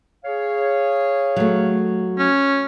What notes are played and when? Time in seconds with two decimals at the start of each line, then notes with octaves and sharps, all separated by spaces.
0.25 G#4 C#5 F5
1.36 F#3 A3
2.18 C#4